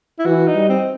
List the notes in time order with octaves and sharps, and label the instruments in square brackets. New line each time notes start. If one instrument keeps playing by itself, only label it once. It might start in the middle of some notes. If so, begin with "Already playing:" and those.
[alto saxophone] E4
[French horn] E3 [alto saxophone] F#4
[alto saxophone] D#4
[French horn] G3
[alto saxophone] C4